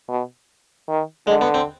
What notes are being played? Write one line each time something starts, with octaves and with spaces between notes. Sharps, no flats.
B2
D#3
D3 G#3
B3
C4